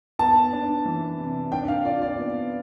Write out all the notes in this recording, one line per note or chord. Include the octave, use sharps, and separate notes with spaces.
B3 A5
D4
E3
C3
D4 G5
F5
F4 D5
D5
B3